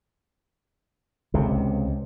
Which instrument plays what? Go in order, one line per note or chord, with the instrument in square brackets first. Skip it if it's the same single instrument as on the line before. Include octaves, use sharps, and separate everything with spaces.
[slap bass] C#2 C3